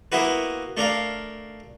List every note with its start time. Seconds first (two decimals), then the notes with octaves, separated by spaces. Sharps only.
0.12 A#3 B3 E4 F#4 B4
0.77 A3 D4 A#4 F5